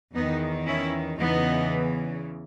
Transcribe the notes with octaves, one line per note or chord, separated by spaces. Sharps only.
E2 D#3 B3 D#4
C#4 E4
E2 C#3 E3 B3 D#4